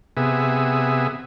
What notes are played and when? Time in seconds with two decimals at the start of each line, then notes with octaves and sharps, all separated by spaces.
0.17 C3 B3 G#4 E5